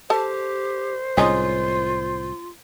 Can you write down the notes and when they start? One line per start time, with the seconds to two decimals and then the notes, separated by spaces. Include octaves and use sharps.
0.10 G4 A4 C5 A5
1.17 C2 A2 G#3 C#4 D#4 F4